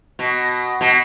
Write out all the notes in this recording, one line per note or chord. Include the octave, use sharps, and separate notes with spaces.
B2
B2